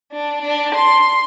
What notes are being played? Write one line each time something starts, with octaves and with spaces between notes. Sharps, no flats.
D4
D4
C6